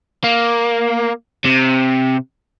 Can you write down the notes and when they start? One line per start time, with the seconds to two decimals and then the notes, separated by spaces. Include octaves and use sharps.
0.24 A#3
1.45 C3